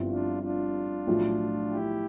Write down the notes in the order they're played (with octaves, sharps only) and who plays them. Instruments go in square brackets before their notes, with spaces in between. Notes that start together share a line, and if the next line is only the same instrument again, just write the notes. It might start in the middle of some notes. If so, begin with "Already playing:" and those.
Already playing: [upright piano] G1 G2 F3 C4 E4
[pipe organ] D4 F4
D4 F4
[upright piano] B1 A2 F3
[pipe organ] E4 G4